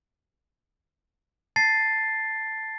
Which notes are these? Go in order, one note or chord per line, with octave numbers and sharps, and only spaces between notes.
A5 A6 C7